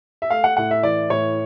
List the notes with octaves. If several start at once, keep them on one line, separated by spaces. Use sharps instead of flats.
E5
A3 F5
F#5
A2 F#5
E5
E3 D5
A2 C#5